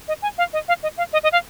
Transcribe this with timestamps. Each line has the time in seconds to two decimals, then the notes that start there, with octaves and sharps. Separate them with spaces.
0.08 D#5
0.22 G#5
0.38 F5
0.53 D#5
0.68 F5
0.83 D#5
0.97 F5
1.13 D#5
1.23 D#5
1.32 F5